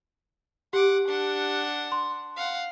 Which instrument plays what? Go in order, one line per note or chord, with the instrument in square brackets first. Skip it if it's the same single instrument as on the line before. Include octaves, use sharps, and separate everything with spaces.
[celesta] G4 [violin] F#5 D6
[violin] D4 F#5
[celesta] C6
[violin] F5 F#5